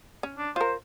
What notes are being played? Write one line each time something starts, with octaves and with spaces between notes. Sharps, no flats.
C#4
D4
F4 A#4 C5